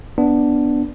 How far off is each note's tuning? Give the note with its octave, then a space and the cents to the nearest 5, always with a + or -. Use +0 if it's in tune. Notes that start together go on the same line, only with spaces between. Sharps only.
B3 +0 D4 +0